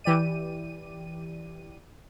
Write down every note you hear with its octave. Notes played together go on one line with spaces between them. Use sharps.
E3 G4 D5 D#7